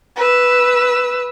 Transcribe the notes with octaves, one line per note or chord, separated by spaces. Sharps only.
B4 E6